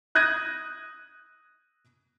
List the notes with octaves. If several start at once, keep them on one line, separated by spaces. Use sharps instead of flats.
D#6 F#6 G#6 A#6 D#7